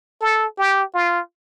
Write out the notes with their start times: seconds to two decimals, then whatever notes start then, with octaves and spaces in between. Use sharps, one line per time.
0.21 A4
0.58 G4
0.94 F4